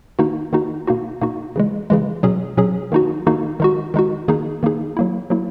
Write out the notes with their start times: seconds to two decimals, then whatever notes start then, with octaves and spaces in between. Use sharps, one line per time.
0.19 D#3 A#3 D#4 F#4
0.53 D#3 A#3 D#4 F#4
0.87 B2 A#3 D#4 F#4
1.21 B2 A#3 D#4 F#4
1.56 C#3 E3 G#3
1.90 C#3 E3 G#3
2.23 B2 F#3 C#4 G#4
2.57 B2 F#3 C#4 G#4
2.92 D#3 A#3 D#4 F#4
3.27 D#3 A#3 D#4 F#4
3.60 D#3 G#3 D#4 F#4
3.94 D#3 G#3 D#4 F#4
4.28 D#3 A#3 D#4 G#4
4.63 D#3 A#3 D#4 G#4
4.97 F#3 A#3 E4
5.30 F#3 A#3 E4